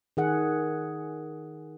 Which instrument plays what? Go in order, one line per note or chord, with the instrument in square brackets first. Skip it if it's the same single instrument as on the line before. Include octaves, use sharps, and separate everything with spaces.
[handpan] D#3 G#4 F#5